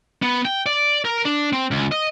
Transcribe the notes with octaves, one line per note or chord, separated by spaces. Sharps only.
B3
G5
D5
A#4
D4
C4
C#2
D#5